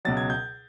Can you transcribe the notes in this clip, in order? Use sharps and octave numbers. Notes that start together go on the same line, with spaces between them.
C#2 B2 F#3 A6
G#6
G6